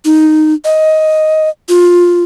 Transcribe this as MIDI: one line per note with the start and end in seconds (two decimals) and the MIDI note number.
0.05 0.54 63
0.65 1.49 75
1.69 2.24 65